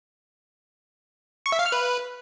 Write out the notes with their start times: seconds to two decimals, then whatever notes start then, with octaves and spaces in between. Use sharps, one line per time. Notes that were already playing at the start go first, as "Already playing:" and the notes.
1.46 C#6
1.52 E5
1.59 F5
1.66 F6
1.72 B4